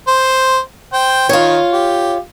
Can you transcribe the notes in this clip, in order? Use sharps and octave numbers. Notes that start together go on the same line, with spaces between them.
C5
C5 G5
D#3 F4 C#5
G4